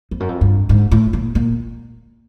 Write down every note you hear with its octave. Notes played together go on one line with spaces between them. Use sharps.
F2
F#2
F2
G2
G#2
A2
A#2
A#2